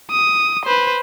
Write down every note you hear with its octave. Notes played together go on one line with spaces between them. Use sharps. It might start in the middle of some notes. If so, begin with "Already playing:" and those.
D#6
B4 C5